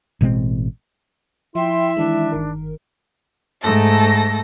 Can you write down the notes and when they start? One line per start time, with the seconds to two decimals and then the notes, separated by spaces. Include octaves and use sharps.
0.21 A1 B2 G#3 C4
1.55 F3 E4 E5 G5 C6
1.97 D#3 E3 G#3 D4
2.32 G1 D#3 A#4
3.63 G#2 A3 A4 A#6